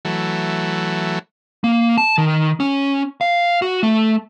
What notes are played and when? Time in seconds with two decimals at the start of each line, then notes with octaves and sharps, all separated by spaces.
0.05 E3 F#3 A3
1.64 A#3
1.98 A5
2.18 D#3
2.60 C#4
3.21 F5
3.62 F#4
3.83 A3